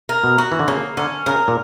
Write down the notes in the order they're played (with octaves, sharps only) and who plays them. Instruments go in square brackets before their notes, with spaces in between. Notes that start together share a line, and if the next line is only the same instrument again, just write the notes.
[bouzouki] A#4
[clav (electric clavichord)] B2
[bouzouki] F#4
[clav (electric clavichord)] E3
D3
[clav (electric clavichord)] C#3 [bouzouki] A#3
[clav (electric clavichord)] D3 [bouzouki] C#4
[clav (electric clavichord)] C#3 [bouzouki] A#4
[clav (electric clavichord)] A#2